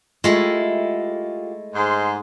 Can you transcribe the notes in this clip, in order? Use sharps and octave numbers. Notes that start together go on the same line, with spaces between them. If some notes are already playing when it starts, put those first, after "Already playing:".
G#3 A3 E4 F4 G4
G#2 C6